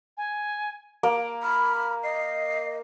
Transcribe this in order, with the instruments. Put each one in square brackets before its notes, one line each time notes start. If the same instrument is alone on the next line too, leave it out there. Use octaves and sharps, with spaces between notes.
[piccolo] G#5
[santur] A#3 [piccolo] D7
[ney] B5 [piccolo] F6
[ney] D#5 [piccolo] C7